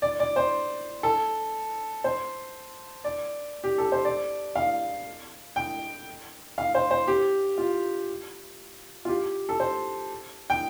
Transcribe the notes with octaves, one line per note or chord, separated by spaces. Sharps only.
D5
D5
C5
A4
C5
D5
G4
A4
C5
D5
F5
G5
F5
C5
C5
G4
F4
F4
G4
A4
C5
G5